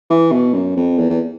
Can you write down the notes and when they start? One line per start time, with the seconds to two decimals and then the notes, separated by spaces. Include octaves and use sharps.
0.10 E3
0.32 B2
0.54 F#2
0.77 F2
0.99 E2
1.10 E2